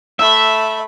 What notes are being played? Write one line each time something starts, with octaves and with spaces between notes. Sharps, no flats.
A3 E5 B5